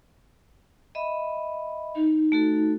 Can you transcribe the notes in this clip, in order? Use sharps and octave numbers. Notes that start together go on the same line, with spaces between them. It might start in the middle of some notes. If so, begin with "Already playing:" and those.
D#5 E5 B5
D#4
A3 F#4 A4